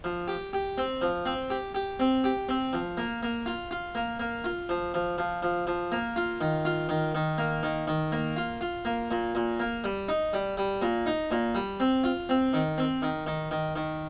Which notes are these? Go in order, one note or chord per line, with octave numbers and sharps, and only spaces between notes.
F3
G4
G4
C4
F3
C4
G4
G4
C4
G4
C4
F3
A#3
A#3
F4
F4
A#3
A#3
F4
F3
F3
F3
F3
F3
A#3
F4
D#3
F4
D#3
D#3
A#3
D#3
D#3
A#3
F4
F4
A#3
A#2
A#2
A#3
G3
D#4
G3
G3
A#2
D#4
A#2
G3
C4
F4
C4
D#3
C4
D#3
D#3
D#3
D#3